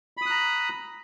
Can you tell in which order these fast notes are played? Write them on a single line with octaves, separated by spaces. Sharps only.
B5 D#6 F#6 A#5